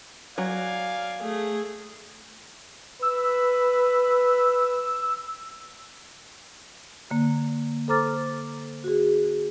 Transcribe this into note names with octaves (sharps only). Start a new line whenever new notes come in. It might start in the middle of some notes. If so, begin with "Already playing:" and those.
F#3 D5 F5 G#5
A3 G#4
B4 E6
D3 A#3
A4 C5 A#5 D6 F6 A6
F#4 G#4